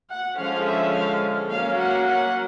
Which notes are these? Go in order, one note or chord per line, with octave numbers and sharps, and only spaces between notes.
F#5
D3 F3 G#3 C#4 F5
E5
F5
F#3 A#3 C#4 F5
F#5
F#5